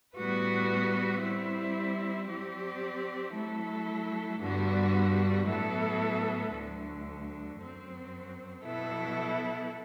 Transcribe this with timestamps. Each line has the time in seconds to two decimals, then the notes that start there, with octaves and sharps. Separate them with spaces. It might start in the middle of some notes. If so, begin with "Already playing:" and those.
0.15 A2 G3 B3 F#4 B4
1.21 G3 C4 E4
2.27 F#3 C4 G4 D5
3.33 F#3 A3 E4 A4
4.39 G2 D3 G3 B3 F#4
5.45 A2 F#3 B3 E4 A4
6.51 D2 D3 F#3
7.57 F#2 F#3 C4
8.63 B2 F#3 B3 E4 A4